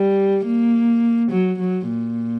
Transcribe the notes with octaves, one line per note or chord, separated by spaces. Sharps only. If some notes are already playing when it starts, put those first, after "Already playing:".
Already playing: G3
A#3
F#3
F#3
A#2